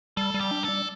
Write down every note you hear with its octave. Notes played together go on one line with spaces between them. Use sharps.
G3 A4
G3
G4
D4
A4
G3